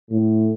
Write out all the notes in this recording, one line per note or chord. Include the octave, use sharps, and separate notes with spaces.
A2